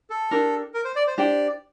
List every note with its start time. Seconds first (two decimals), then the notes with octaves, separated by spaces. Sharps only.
0.10 A4
0.31 D4 G4 A#4
0.74 A#4
0.85 C5
0.96 D5
1.07 C5
1.18 D4 G4 C5 D5 G5